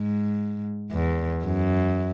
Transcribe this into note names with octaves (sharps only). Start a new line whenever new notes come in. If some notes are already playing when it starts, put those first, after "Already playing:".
Already playing: G#2
E2
F#2